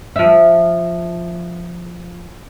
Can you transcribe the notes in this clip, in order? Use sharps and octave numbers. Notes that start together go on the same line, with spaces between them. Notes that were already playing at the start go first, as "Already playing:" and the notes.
F3 E5